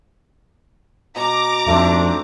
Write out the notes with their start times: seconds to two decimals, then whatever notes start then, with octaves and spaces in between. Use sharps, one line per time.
1.16 B2 A#5 D6
1.67 F2 G#2 A3 C4 D4